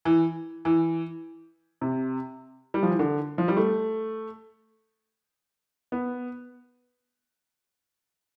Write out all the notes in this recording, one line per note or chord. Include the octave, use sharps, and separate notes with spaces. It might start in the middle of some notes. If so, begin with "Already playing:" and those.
E3
E3
C3
G3
F3
E3
D3
F3
G3
A3
B3